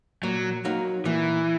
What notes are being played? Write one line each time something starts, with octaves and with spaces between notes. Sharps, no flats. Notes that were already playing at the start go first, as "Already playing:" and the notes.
A#2 F#3
F#3 A#3 D#4
A#2 E3